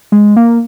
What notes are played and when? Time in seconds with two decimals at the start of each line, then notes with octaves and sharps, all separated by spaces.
0.12 G#3
0.36 A#3